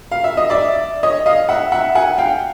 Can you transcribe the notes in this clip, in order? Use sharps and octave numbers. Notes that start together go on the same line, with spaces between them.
F5
E5
D#5
D5 E5
C#5 D#5
D#5 F5
E5 F#5
E5 F#5
F#5 G#5
F5 G5